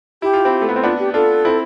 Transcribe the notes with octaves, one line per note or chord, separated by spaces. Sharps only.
E4 G4
F4
C4 E4
A3
B3
C4
B3 D4 F4
G4
D4 F4 A4
C4 E4